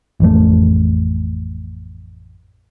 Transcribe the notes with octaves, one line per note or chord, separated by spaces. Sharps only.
A1 F2 A3